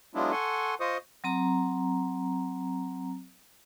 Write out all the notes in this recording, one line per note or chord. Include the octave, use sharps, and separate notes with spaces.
F#3 G#3 B3 D4 E4 F4
A4 F#5 G#5 C6 C#6
F4 C5 D#5 C#6 D#6
F#3 C4 A#5